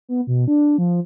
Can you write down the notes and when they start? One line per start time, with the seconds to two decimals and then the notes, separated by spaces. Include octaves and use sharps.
0.09 B3
0.27 B2
0.48 D4
0.78 F3